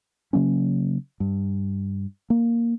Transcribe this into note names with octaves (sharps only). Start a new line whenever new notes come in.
C#3 F#3 A#3 C#4
G2
A#3